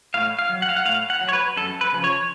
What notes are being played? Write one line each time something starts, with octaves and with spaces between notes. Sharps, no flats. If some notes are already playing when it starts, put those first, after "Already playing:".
A2 F5
F5
F#3
F#5
F5
F#5
A2 F5
F#5
F#3
C#5
B4
F#2 A4
B4
C#3 F3
C#5